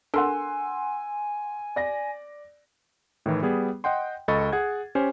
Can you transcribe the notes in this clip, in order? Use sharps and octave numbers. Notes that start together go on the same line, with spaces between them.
D4 A4 A#4 F#5 G#5 C6 E6
D5 A#6
A2 D#3 E3
G3 B3 G#4
D#5 F#5 G5 C6
C#2 A4 D#5 B5 C#6 A6
G#4 F#5 G#6
C#4 G4 C5 G#5